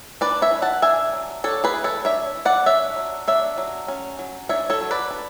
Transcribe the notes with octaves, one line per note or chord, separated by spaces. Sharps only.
D4 B4 D5
C#5 E5
E3
F#5 A5
D4 E5 G#5
F#3
D4 A4 C#5
G#4 B4
E3
A4 C#5
D4 C#5 E5
E3
D5 F#5
D4 C#5 E5
F#3
D4 C#5 E5
F#3
C#4
F#3
D4 C#5 E5
A4 C#5
F#3
B4 D5
D4